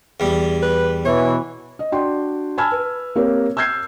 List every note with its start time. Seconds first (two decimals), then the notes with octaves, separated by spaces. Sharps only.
0.20 E2 G3
0.62 B4
1.05 B2 E3 C#5
1.79 D#5
1.92 D4 F#4 D5 G5 C6
2.58 G#5 A5 B5 E6 F6 G#6
2.72 B4
3.16 A#3 C4 G4 A#4 C#5
3.57 E6 F6 G6 G#6 C7